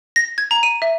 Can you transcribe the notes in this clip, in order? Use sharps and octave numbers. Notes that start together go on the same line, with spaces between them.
A#6
G#6
A#5
D#7
E5